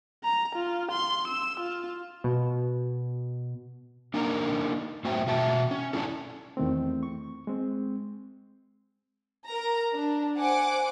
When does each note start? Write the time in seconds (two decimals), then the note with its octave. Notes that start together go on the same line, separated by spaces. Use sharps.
0.24 A#5
0.55 F4
0.92 C6
1.28 E6
1.60 F4
2.24 B2
4.14 A#3 D4 D#4 A#4 D#5 A#5
5.05 A2 A3 F#4 C5 E5 G5
5.27 B2 F#4 E5 A5
5.71 C#4
5.93 C#4 D4 E4 F4 A4
6.57 E2 D#3 A3 C4
7.03 C#6
7.47 G#3 C4
9.46 A#4 A#5
9.94 D4
10.37 C5 F#5 G#5 D6